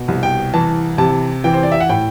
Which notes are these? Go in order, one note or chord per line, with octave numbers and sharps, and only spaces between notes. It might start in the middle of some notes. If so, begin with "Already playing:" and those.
Already playing: B2
C2
G5
E3 A5
C3 A5
E3 G5
C5
D5
E5
F#5
A2 G5